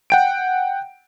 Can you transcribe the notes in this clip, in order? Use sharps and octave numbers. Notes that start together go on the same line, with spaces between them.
F#5 G5 D7